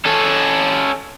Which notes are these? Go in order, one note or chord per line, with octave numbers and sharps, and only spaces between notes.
C#4 A4